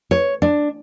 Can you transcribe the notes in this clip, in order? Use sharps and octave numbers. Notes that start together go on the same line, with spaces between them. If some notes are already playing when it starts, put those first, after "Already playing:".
C#5
D4